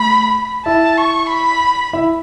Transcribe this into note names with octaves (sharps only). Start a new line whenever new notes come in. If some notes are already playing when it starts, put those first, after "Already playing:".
Already playing: A3 B5
E4 E5 A5
C#6
B5
E4 E5